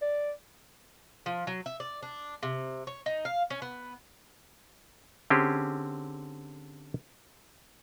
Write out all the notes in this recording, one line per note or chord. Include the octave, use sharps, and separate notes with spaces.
D5
F3
F#3
E5
D5
D4
C3
C#5
D#4
F5
C#4
B3
D3 C4 C#4 G4 G#4